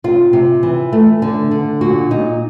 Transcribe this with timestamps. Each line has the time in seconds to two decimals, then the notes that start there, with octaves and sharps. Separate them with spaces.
0.04 C3 F4
0.33 C3
0.63 E3
0.92 A3
1.22 D3
1.51 D3
1.81 A#2 F#4
2.10 A#2 D#4